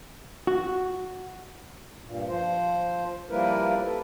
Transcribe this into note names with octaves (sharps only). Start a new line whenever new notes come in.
F#4
G2 A#2
F3 C5
F3 G3 A#3 E4 A#4 B4
A4 B4